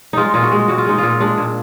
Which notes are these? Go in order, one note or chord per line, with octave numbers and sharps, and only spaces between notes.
G#3 D#4 F4
A#2 F4
F#4
G#3
A#2 F#4
F4
G#3 D#4
A#2 F4
G#3 D4
A#2